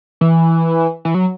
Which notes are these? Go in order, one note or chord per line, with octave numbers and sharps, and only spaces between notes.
E3
E3
F#3